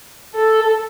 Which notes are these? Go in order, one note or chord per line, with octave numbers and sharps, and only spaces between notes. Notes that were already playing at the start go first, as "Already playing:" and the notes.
A4